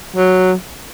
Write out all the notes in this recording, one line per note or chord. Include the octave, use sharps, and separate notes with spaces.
F#3